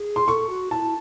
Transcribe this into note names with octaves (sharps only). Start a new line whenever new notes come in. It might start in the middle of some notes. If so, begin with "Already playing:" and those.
Already playing: G#4
C6
A4 C#6
F#4
E4 A5